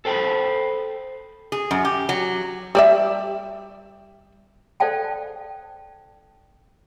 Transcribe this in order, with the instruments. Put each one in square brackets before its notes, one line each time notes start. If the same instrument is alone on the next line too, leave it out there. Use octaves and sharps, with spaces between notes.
[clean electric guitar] A4 C5 G5 A#5 B5
[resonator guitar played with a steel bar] G#4
F#2
G4
F#3
[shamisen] G3 D5 E5
[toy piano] A4 C5 D5 F5 G5 A5